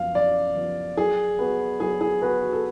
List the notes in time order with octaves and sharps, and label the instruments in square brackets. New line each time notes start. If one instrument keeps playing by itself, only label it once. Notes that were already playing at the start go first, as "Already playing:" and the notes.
Already playing: [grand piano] F#2 F3 B3 [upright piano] F5
[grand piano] F#2 [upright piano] D5
[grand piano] F3 B3
[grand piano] F#3 [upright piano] G#4
[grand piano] B3 F#4 B4
[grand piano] F#3 [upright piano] G#4
[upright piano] G#4
[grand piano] B3 F#4 B4 [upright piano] G#4
[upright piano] F#4
A4